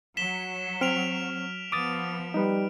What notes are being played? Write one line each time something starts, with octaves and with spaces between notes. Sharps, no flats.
F#3 B6 E7 G7
C4 F6 D7 F7
F3 B3 D6 D#6 A6 D7
G3 D#4 B4